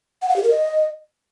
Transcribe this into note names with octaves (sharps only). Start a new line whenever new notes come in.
F#5
F5
G4
A#4
D#5